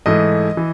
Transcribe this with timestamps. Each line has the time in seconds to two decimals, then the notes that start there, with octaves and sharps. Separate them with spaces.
0.06 G#2 E3 A3 D#5
0.57 E3